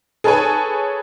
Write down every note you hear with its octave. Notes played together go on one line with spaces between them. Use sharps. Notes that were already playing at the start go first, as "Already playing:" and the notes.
G#4 A4 B4 C#5 G#5